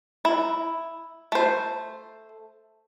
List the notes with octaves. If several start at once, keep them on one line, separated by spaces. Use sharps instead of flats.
E4
A3 C5